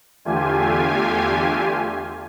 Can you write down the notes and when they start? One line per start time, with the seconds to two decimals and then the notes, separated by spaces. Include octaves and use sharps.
0.25 E2 D3 A3 F4 G4 G#5